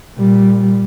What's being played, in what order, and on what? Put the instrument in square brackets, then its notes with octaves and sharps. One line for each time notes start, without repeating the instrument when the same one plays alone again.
[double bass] A#2 G3